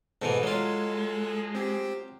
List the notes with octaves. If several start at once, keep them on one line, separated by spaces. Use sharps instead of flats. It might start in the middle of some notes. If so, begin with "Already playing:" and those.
G#2 B2 E3 A4
F#3 G#3 F4
C4 G4